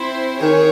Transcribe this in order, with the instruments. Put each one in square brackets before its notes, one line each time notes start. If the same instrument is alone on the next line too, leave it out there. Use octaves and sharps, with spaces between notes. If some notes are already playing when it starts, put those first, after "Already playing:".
Already playing: [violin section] C4 E4 C5
[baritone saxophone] D#3 [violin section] G#4 C#5